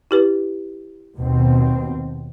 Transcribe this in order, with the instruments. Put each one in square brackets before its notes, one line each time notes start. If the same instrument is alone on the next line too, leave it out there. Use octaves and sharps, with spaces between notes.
[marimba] E4 G4 B4
[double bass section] D#2 B2 C4